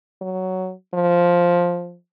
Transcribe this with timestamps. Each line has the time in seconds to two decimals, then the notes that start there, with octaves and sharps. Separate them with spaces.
0.21 F#3
0.94 F3